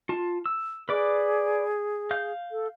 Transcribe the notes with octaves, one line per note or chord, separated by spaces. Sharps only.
F4 A5
E6
G#4 B4 D5 D6
F5 G6
A4